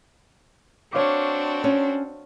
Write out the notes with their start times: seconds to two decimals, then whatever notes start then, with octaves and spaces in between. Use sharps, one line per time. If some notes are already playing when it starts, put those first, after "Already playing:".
0.93 C4 D4 F#4 C#5 F5 D6
1.64 C#4